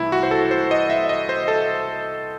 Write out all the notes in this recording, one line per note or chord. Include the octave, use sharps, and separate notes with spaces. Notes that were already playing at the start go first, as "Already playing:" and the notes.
Already playing: C2 C3 E3 A3 E4
F#4
C5
A4
C5
D#5
E5
D#5
C5
A4